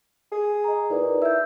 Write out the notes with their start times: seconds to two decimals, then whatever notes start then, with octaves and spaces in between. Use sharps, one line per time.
0.32 G#4
0.64 D#5 A#5
0.90 A#2 D#4 E4 B4
1.22 E4 E6 G6